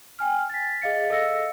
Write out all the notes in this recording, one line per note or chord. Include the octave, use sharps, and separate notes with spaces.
G5 G#5 F6
A6 B6
G#4 D#5 F5 A6 C#7
A4 D#5 F5 E6 A#6 C#7